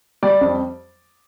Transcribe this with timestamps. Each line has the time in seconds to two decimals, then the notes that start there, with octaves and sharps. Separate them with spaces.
0.23 G3 D5
0.41 F2